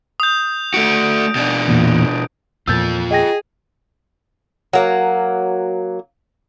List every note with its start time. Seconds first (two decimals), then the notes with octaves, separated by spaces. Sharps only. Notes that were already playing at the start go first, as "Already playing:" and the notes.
0.20 D#6 G6
0.74 A3 F#4 D7
1.35 B2 D4
1.68 E2 A#2
2.67 E2 A#2 F3 F4 A4 E6 G6 A6
3.11 G#4 D#5 G5 A#6
4.73 F#3 A#3